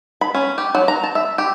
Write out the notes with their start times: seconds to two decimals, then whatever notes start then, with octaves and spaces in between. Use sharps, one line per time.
0.21 B5
0.35 C#4
0.58 G4
0.75 F#3
0.88 A#5
1.04 A5
1.15 E5
1.38 G4